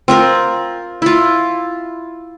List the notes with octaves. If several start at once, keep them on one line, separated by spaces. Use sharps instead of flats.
C4 F4 A#4
E4 F4